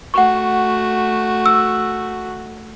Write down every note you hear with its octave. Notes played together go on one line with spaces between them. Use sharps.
A3 F#4 F#5 C#6
E6